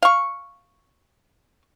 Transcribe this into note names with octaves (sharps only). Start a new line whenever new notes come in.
F5 C#6